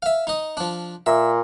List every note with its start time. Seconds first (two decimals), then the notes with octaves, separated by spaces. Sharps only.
0.02 E5 F5
0.27 D#4 D#5
0.57 F3 D4
1.06 A#2 E5